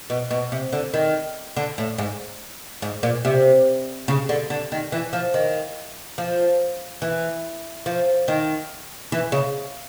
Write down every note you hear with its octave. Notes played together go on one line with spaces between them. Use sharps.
B2
B2
C3
D3
D#3
D3
A2
G#2
G#2
A#2
C3
C#3
D3
D3
D#3
E3
F3
D#3
F3
E3
F3
D#3
E3
C#3